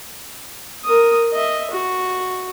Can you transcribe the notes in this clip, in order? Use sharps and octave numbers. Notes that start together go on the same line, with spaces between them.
A#4 D#6
D#5 E5
F#4